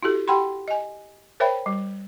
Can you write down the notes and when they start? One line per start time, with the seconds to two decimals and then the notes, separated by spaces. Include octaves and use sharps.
0.03 E4 F#4 G4 A4
0.28 G4 F#5 G5 B5 C6
0.68 D#5 G#5
1.40 A#4 C5 C#5 E5 G5 B5
1.66 G3